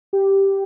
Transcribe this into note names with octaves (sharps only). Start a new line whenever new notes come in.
G4